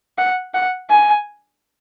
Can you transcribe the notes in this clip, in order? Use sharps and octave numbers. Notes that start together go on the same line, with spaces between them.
F#5
F#5
G#5